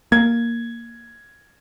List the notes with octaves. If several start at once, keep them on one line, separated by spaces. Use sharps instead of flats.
A#3 G#6